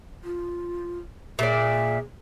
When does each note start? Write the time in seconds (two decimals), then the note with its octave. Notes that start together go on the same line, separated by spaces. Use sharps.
0.24 F4
1.39 A#2 G#4 D5 E5